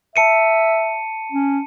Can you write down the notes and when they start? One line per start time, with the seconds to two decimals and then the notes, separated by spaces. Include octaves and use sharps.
0.16 E5 A5 C#7 D#7
1.32 C#4